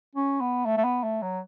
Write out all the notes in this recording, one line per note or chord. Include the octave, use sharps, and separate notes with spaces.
C#4
B3
A3
A3
B3
A3
F#3